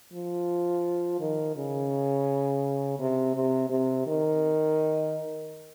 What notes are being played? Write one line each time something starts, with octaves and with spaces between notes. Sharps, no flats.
F3
D#3
C#3
C3
C3
C3
D#3